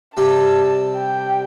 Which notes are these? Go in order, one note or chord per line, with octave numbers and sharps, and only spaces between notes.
C3 G3 C4 A5
G5